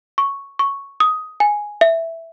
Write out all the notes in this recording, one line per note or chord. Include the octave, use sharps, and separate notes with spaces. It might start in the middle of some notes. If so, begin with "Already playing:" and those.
C#6
C#6
D#6
G#5
E5